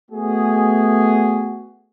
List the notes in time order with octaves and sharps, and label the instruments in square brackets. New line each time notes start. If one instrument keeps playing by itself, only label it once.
[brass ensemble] A3 B3 F#4 G#4